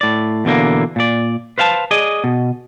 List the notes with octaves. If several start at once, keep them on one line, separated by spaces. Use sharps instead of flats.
A2 D5
E2 B2 D3 A#3
A#2 D5
B4 C5 F5 F#5 A5
G#4 D5 D#5
B2